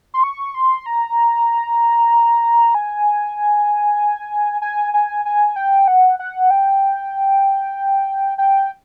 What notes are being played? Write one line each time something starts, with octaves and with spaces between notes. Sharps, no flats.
C6
C#6
C6
A#5
G#5
G#5
G#5
G#5
G5
F#5
F#5
G5
G5